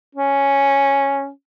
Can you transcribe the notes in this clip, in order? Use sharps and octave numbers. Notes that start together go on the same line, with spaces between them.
C#4